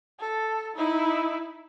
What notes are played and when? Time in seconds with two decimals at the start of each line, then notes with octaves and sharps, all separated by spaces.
0.19 A4
0.76 D#4 E4